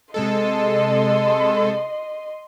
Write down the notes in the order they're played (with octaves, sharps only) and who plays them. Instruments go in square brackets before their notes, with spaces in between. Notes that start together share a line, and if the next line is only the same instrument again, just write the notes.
[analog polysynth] C3 G#3 A4 [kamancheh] D#5 C6